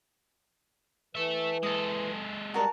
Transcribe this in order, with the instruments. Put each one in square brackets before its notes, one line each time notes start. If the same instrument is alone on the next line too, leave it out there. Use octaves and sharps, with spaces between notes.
[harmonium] E3 [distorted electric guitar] A4 E5
[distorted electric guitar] G#3 A4 [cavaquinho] D#6
[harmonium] G3 [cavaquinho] F#4 A#4 A5